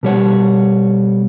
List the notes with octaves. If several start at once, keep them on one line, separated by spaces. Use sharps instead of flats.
B2 G3 C#5 F#5